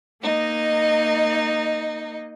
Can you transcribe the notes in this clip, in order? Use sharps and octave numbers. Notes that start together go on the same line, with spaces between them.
A#3 D#4 D#5